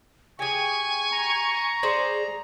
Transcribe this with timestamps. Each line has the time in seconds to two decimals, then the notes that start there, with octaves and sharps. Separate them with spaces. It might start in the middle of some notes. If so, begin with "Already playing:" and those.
0.39 G4 G#4 G#5 C#6
1.12 A#5
1.83 G#4 C5 D5